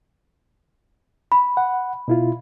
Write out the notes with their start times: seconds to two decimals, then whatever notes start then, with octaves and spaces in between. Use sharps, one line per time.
1.32 B5
1.57 F#5
2.08 B2 E4 F4